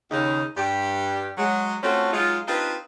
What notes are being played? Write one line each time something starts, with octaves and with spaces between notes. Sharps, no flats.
D#2 C#3 D#4
G2 G4
F#3 G#3
A3 C4 C#4 F4 F#4 A4
F#3 G#3 D#4 F4
C4 D4 D#4 F4 G4 B4